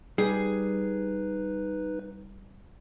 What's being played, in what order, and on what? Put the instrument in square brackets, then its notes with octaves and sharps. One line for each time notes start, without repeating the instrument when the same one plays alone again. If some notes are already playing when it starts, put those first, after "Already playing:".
[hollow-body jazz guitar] G3 [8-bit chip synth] D#4 B4 [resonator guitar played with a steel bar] G#4